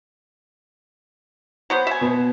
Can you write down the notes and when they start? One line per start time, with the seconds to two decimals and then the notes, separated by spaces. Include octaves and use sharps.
1.70 F#3 B3 C5
1.87 E5 G#5
2.01 B2 B3